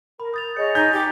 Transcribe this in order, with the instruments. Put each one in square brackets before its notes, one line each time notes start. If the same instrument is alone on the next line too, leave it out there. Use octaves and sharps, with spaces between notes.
[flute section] A#4 [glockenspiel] B5
[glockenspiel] D#6 A6 F7 [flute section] G6
[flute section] G#4 C#5 D#5 [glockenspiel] G6 C#7
[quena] D#4 [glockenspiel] G#5 B6 [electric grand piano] G6
[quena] G4